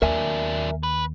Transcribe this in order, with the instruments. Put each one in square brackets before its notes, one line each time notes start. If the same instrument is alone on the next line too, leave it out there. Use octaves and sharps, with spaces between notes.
[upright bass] D#2 [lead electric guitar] F#3 D4 [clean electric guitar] A#4 E5 G#5
[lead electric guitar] B4